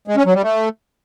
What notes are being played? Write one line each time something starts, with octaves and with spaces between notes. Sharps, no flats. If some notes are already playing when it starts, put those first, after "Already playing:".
G#3
C#4
F#3
G3
A3